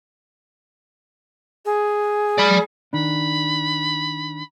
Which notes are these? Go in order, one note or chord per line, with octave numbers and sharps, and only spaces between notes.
G#4
D5 B5
D#3 D4 B5